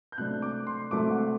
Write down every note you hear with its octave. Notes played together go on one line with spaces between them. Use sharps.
G6
C3 F#3 A3 D4 F#6
D6
C6
C3 F#3 A3 D4 D6
F#5